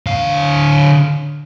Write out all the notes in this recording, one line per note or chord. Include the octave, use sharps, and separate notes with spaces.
D3 F5